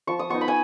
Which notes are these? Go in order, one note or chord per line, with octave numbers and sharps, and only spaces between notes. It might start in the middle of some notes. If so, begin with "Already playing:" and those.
F3 C#6
D#6
B3 D#4 C#6
B5
G#5